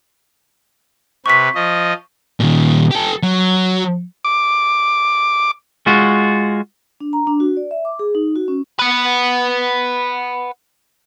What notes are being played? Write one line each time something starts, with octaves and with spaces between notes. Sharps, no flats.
C3 B4 C#6 B6
F3 D#5
A#2 D#3
G4 A4
F#3
D6
G#3 F4 F#4
D4
A#5
D4
F#4
D5
E5
D6
G#4
D#4
F#4
C#4
B4 F#5